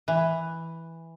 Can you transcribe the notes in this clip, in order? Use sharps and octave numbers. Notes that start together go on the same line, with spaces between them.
E3